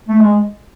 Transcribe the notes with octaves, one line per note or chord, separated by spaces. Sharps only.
A3
G#3